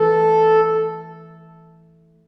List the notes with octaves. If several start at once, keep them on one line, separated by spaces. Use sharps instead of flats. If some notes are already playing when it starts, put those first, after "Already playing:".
Already playing: E3 A3 A4